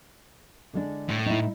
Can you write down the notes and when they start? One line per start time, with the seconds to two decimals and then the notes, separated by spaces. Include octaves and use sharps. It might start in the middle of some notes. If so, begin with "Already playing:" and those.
0.73 D3 G#3 D4
1.09 A2
1.26 D#4 E4